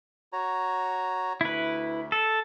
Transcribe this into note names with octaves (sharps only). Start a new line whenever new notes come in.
F#4 C#5 A#5
D2 E4 B4
A4